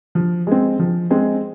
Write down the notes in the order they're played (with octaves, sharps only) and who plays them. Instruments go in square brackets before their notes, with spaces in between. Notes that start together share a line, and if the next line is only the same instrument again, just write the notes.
[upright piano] F3
G#3 C4
F3
G#3 C4